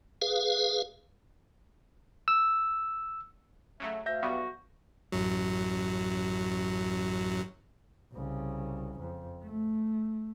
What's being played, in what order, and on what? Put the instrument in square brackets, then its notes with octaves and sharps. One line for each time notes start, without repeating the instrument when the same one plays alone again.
[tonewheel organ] G#4 B4 F5
[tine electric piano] E6
[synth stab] C#3 F#3 A3 [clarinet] E5
[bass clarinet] D2 [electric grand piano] E5 G6 A#6 [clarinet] F5
[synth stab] B1 G3 B3 [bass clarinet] F#4
[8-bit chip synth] A1 F#2 F#3
[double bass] C2 C#3
F2
A3